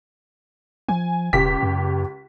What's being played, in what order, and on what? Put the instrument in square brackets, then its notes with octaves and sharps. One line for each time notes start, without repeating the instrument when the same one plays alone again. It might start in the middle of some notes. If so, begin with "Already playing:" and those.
[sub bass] F3 [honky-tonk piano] G#5
[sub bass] E1 [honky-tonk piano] C#2 G4 B6
[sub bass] F#2